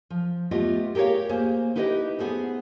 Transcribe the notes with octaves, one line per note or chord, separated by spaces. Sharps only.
F3
A3 B3 F4 G4 D#5
G4 G#4 A#4 C5 C#5 F5
A#3 G#4 C5
D#4 E4 G4 B4 C#5 D#5
B3 G#4 A4 C5